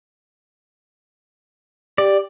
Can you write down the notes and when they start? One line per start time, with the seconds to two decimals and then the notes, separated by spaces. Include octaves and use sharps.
1.98 G4 D5